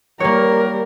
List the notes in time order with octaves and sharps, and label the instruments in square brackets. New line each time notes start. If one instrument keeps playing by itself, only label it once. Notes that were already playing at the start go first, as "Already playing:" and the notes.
[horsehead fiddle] G3 A#4 [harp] A#3 C#5